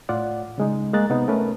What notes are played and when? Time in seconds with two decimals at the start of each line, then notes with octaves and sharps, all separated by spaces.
0.09 A2 F4 D5 F#5
0.58 C#3 G#3 D#4
0.94 G#3 A#3 A#5 F#6 A6
1.10 C3 B3 D#4
1.28 A3 C#4 A#4 B4